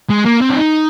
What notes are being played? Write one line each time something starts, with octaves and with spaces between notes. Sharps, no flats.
G#3
A#3
C4
D4
D#4